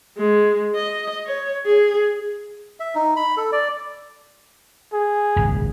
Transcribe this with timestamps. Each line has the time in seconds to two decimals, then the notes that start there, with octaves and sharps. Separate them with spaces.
0.17 G#3
0.76 D#5
1.26 C#5
1.66 G#4
2.80 E5
2.95 D#4
3.16 B5
3.37 A4
3.52 D5
4.93 G#4
5.36 D#1 G#1 C#2